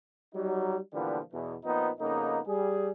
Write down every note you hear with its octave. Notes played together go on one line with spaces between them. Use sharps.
F#3 G3 D#4
A#2 D3 E3 F3 G3 B3
E2 B2 E3
A#2 F3 B3 C4 D#4
F2 C#3 A#3 B3 D#4
G3 G#4